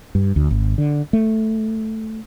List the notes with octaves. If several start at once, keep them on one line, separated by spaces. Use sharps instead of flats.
G2
D2
G#1
D3
A3